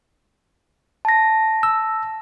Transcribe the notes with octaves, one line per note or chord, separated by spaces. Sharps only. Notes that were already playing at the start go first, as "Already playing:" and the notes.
A5 A#6
E6